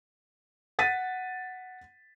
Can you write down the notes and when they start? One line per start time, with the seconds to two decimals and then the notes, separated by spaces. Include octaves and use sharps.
0.79 F#5 A6 B6 D#7